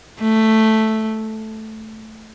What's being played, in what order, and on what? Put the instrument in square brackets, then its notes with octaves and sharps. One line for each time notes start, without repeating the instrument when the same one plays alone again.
[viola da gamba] A3